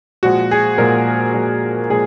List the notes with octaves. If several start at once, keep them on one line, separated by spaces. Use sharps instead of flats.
A#2 F3 G#3 F#4
G#4
A#2 F3 G#3 A#4
A#2 F3 G#3
A#2 F3 G#3 G#4